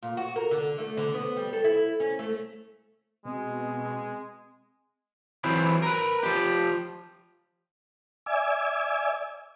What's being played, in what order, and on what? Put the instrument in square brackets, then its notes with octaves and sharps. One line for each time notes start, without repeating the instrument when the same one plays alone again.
[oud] A#2
F#4
A#4
D3
A3
D3
B3
G3
A4
E4
C#4
A3
[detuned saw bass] B2 [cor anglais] G#3 [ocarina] C4
[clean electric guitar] E3 F#3 C4 E4
A#4 B4
F3 G4
[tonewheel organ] D5 E5 G#5